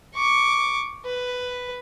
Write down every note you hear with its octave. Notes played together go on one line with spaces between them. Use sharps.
C#6 D6
B4